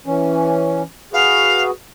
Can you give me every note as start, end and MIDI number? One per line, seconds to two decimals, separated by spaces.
0.06 0.83 52
0.06 0.83 61
1.13 1.71 66
1.13 1.71 68
1.13 1.71 71
1.13 1.63 77